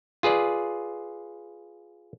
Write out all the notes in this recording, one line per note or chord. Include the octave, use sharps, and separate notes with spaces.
F4 G#4 B4 D5